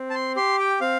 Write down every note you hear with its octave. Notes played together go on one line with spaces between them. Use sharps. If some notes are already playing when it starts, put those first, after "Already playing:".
Already playing: C4
A5
C6
G4 C6
G5
C4 F5